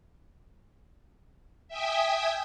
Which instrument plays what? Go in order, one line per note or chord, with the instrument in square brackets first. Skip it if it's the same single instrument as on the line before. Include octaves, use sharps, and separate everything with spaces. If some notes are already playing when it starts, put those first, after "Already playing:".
[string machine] E5 G5 G#5 D#6